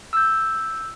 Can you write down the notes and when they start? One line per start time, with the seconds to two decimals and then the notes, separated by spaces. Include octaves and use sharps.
0.13 E6 G6